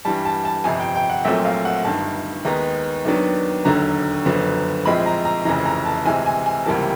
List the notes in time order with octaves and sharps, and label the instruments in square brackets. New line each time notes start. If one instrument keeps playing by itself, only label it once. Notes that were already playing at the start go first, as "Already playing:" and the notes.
[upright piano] G2 E3 G3 A5
A5
A5
G1 F2 C3 G#5
G5
G5
F#5
A#1 A#2 F#3 A3 C4 E5
F5
F#5
G1 G2 D#3 A5
D#2 D#3 G#3 B3 A#5
D#2 D#3 F#3 B3 D4
E1 D#2 D3 F#3 A#5
F#1 F2 D3 F#3 B3
A#1 A2 F3 G#3 C4 B5
A#5
A#5
F1 F2 C#3 E3 A#5
A#5
A5
D2 C3 E3 G#3 G#5
G#5
G#5
C#2 C3 E3 G3 A#3 A5